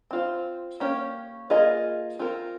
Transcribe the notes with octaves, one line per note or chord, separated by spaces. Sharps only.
C4 F4 C5
A#3 C#4 G4 C#5
A#3 F4 G#4 D#5
C4 F4 A#4